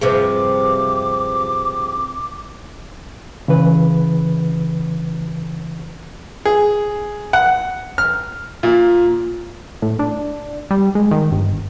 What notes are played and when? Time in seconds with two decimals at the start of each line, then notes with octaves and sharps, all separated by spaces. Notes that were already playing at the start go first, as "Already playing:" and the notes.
0.01 G2 C3 F3 G#4 B4 C5 D6
3.48 C#3 E3 B4
6.45 G#4
7.33 F#5
7.98 F6
8.63 A#2
9.82 A2
9.99 D4
10.71 G3
10.95 G#3
11.11 D#3
11.32 G1